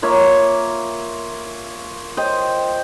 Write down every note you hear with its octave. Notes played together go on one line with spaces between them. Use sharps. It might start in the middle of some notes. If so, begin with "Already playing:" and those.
A#3 F4 C#5 E5
C5 D#5 G5